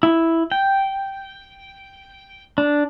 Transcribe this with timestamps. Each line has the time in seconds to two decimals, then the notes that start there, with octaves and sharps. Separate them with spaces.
0.03 E4
0.52 G5
2.58 D4